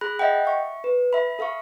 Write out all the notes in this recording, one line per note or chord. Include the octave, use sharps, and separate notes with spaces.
G#4 B5 F#6 A#6
D#5 E5 F#5 G5
E5 C#6
B4
E5 B5
A4 E5 F5 C#6